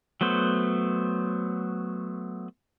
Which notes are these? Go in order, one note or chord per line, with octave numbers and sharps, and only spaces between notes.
F#3 A3 B3 C5